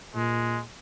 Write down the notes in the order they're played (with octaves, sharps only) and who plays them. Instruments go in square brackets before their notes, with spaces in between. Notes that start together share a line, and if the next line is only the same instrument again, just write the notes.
[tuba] A#2 [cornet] G#3